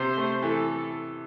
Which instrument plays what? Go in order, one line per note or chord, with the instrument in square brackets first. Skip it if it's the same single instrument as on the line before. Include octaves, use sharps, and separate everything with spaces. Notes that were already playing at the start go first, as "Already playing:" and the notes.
Already playing: [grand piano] C3 [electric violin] C5
[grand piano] A3
[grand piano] E3 [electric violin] A4